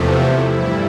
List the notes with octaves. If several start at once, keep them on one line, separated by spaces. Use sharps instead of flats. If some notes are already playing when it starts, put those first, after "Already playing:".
Already playing: E2 C3 F3 A3
E4
G2 E3 G3 E4